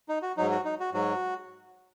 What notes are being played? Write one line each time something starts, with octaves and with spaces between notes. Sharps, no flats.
D#4
F#4
G#2 F#3 D#4
F#4
D#4
F#4
G#2 F#3 F#4